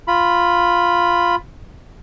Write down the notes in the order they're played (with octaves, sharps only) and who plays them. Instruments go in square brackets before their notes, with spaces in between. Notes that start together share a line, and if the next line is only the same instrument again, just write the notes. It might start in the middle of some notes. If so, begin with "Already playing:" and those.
[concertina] F4 B5